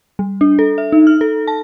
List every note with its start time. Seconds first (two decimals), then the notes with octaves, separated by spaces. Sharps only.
0.19 G3
0.41 D4
0.59 A4
0.78 E5
0.92 D#4
1.07 F6
1.21 A4
1.48 A5